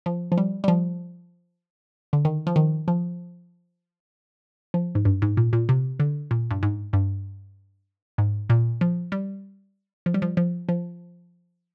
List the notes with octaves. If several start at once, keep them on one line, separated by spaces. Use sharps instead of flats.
F3
F3
G3
G3
F3
D3
D#3
F3
D#3
F3
F3
G#2
G2
G#2
A#2
A#2
C3
D3
A#2
G2
G#2
G2
G#2
A#2
F3
G3
F3
G3
F3
F3
F3